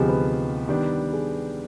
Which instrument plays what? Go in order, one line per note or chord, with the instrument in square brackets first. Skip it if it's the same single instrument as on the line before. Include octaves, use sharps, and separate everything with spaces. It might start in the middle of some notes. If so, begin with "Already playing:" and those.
Already playing: [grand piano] D2 C3 F3 B3 D#4 [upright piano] G4 G#4
[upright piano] B4
[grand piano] D#3 G3 B3 D4
[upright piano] G#4